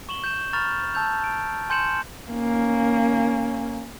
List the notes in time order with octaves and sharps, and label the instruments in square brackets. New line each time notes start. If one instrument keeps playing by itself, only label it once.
[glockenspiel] C#6 E7 F#7 G7
G6 E7
A#5 B5 C#6 F6 A6 F7
A5 E6 G6 F7
D7
G#5 C6 G6 C#7 E7 F#7
[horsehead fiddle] A#3 C#4